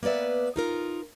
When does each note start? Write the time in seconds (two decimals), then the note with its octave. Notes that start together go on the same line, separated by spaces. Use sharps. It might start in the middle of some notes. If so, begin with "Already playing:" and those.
0.03 A#3 B3 B4 D5 E5
0.56 D#4 F4 A#4